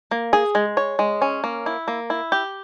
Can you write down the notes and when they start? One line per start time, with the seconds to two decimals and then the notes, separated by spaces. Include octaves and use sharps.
0.11 A#3
0.33 G#4
0.55 G#3
0.77 C#5
0.99 G#3
1.22 C#4
1.44 A#3
1.66 E4
1.88 A#3
2.10 E4
2.32 G4